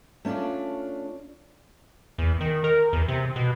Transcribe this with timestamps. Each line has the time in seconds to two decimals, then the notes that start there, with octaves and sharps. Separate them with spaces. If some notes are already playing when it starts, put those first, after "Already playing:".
0.25 A3 C#4 D4 F4 D5
2.18 E2
2.41 D#3
2.64 A#4
2.93 E2
3.08 C3
3.36 B2